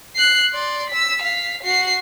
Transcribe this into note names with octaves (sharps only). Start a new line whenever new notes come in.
F#6 C7
D5 C6
E6 B6
F5 B6
F#4 C7